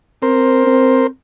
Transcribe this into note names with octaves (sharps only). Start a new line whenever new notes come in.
C4 A#4 C5
C4